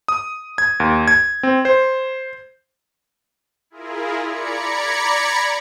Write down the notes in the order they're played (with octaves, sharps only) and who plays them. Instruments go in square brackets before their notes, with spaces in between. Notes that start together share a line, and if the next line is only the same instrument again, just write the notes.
[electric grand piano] D#6
G#6
D#2
G#6
C4
C5
[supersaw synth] E4 F4 G#4 A#4
D5 A#5 B5 G#6 C#7